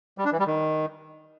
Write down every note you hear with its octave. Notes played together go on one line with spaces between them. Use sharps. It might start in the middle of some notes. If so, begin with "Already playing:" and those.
G3
D4
E3
G3
D#3